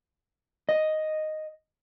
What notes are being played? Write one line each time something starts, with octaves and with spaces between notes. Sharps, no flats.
D#5